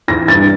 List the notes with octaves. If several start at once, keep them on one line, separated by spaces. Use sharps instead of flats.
E3 A#6
G2 A6